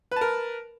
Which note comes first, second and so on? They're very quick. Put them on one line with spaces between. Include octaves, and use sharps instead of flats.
B4 A5 A#4